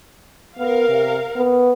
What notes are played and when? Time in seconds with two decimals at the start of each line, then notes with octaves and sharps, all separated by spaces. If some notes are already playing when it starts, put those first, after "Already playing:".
0.58 B3 A#4 F5
0.89 C3
1.36 B3